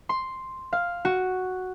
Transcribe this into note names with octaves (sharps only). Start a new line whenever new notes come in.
C6
F5
F#4